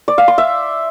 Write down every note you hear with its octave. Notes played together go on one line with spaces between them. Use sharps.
D5
F5
C6
E5